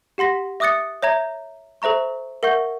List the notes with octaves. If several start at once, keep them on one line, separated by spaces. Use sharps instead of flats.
G4 F#5 C6 A#6 B6
E5 D6 D#6 F#6 A6 C#7
C#5 E5 A#5 G#6
A4 C5 E5 A#5 C#6
A#4 E5 F#5 C#6 G6